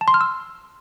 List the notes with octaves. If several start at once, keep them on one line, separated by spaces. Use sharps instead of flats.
A5
C6
F6
E6